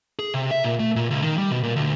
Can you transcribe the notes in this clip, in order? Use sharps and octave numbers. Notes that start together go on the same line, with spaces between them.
G#4
C3
E5
A#2
A3
A#2
C#2
D#3
G3
B2
A#2
D2